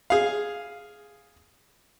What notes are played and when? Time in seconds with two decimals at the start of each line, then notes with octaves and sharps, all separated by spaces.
0.10 G#4 F5